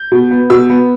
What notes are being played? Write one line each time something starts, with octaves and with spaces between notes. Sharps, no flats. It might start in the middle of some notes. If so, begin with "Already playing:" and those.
Already playing: G6
B2
B3
B2 E6
B3